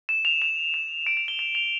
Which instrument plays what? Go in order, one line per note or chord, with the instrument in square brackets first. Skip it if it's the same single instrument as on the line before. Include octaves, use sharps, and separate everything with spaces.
[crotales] E7
F7
F7
E7
D7
F7
G7
F7
F7